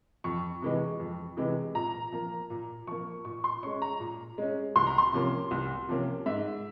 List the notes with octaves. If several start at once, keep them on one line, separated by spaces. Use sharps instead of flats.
F2 C#6
C3 E3 G#3
F2
C3 E3 G#3
A#2 A#5
F3 A#3
A#2
F3 A#3 C#6
A#2 C#6
C6
G#3 C#4 C#6
A#5
A#2
G#3 C#4
C2 C6
A#5
C6
C3 F3 A#3 C#4
C2
C3 F3 A#3 C#4
G#2 E5